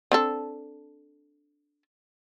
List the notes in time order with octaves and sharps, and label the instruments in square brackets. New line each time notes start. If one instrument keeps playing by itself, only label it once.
[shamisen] C4 D4 A4